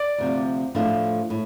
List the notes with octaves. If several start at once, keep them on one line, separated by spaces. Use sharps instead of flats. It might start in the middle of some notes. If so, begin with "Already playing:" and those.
Already playing: D5
D2 C3 F3
A2 F3 A3 D4 F4
A2